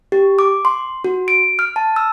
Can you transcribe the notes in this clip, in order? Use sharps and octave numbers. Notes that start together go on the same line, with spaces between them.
G4
D6
C6
F#4
D7
F6
A5
E6